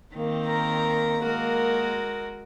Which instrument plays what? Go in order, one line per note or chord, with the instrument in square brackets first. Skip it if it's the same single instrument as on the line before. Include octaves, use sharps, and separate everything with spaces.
[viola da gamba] D#3 C4 [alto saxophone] A#3
[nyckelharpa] A#4 A#5
[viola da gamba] G#3 [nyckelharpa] F#4 A#4